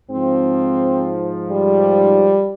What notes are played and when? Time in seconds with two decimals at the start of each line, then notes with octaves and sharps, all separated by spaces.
0.11 G#2 F3 C4
1.50 G3